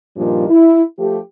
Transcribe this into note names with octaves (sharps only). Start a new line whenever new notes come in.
G2 A#2 D#3 F3 G3
E4
F3 A3 G4